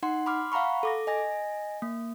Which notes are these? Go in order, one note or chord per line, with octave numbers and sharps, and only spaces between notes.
D#4 F#5 C6
B5 C6 D6 F6
F5 F#5 A#5 B5 C#6
A4 D6 A#6
D#5 G#5 A#6
A#3